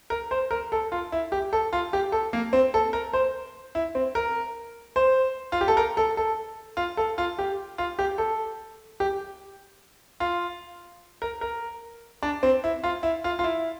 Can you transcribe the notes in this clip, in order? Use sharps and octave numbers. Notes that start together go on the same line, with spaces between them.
A#4
C5
A#4
A4
F4
E4
G4
A4
F4
G4
A4
A#3
C4
A4
A#4
C5
E4
C4
A#4
C5
F4
G4
A4
A#4
A4
A4
F4
A4
F4
G4
F4
G4
A4
G4
F4
A#4
A#4
D4
C4
E4
F4
E4
F4
F4
E4